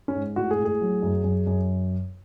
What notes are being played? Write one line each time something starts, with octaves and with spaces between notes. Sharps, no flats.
C#4
G#2
A2 F#4
G#4
A2
G#4
F#3
F#2
F#2
F#2